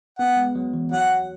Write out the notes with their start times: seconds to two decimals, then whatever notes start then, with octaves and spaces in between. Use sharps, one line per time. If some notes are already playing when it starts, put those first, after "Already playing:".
0.18 B3 F#5
0.36 G#3
0.55 F#3
0.74 E3
0.92 F#3 F#5